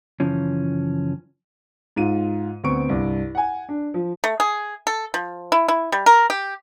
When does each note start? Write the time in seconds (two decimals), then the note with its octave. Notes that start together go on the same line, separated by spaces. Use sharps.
0.20 F#2 C#3 E3 F3 C#4
1.96 G#2 F4 D#7
2.64 D2 B3 C4 C#6 D7
2.89 C2 G2
3.35 F#5 G#5
3.69 D4
3.94 F3
4.24 A3
4.40 G#4
4.87 A4
5.14 F3
5.52 E4
5.68 E4
5.92 G3
6.06 A#4
6.30 G4